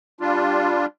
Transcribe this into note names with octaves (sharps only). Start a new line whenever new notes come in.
G3 D4 F4